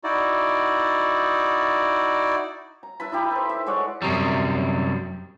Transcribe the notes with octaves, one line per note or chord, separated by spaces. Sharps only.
D#4 E4 F#4 D5
A#5
E4 B4 A5 B5
D#4 E4 G4
A4 C5
E5
G#3 C#5 D5 F#5
F#2 C3 F#3 G3